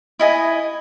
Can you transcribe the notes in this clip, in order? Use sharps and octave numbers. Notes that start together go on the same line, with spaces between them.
E4 D#5 G#5